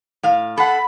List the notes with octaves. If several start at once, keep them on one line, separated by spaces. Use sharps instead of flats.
A2 F5
A4 F#5 B5